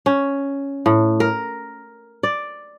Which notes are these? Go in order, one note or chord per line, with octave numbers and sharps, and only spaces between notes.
C#4
A2
A#4
D5